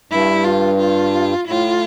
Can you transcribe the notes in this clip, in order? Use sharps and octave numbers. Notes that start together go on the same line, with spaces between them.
G2 E4
F4
F4
A2 F4